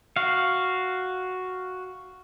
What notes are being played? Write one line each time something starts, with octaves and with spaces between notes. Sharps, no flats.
F#4 F5